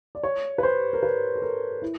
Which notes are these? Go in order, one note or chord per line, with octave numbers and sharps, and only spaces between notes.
D5
C#5
B4
C5
A#4
B4
A4
A#4
E4